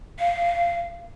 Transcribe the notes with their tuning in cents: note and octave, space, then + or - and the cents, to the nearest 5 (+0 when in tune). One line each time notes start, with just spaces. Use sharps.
F5 -15